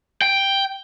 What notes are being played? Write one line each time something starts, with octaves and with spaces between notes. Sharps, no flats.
G5